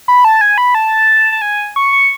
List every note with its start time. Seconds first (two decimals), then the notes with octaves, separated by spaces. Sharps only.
0.08 B5
0.25 A5
0.41 G#5
0.58 B5
0.75 A5
1.32 A5
1.42 G#5
1.76 C#6
1.93 C#6